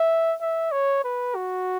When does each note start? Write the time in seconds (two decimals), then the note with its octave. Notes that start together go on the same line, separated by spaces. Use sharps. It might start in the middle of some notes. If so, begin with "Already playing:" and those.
Already playing: E5
0.41 E5
0.72 C#5
1.04 B4
1.35 F#4